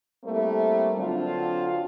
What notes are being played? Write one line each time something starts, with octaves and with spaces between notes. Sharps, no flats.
G3 A3 A#3 C4 E4
D3 F#3 C4 D4 F4